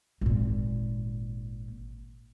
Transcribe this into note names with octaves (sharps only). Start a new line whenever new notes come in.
G#1 A#2